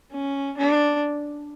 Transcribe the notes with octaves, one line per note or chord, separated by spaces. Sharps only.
C#4
D4